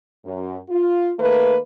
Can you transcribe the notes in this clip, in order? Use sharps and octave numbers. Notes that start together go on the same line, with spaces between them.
F#2
F4
D#3 A3 A#3 B4